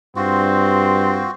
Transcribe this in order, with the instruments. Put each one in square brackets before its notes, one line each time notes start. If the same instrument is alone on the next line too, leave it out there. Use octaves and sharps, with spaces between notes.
[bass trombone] G2 [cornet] C4 [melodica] F4 F#4